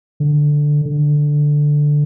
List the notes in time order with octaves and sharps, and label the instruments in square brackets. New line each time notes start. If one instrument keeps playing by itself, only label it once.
[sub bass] D3
D3